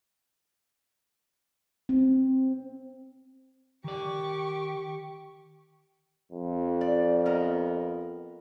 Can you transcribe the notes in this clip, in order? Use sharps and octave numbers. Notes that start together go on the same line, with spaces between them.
C4
D#3 G4 D5 C#6
F2
D5
B3 A#4 D#5